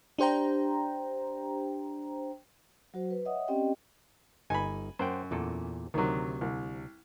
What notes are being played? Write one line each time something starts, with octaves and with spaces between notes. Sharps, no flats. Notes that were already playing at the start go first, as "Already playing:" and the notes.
D4 G4 C5 G5 A#5
F#3 F#4 C5
B4
C#5 D#5 E5 F#5 D#6
C4 C#4 G4 D5 D#5 G5
G1 D#4 G#5 B5
F#2 C5 F#5 G5
E2 A#2 A4
D2 C3 D#3 F#3
C2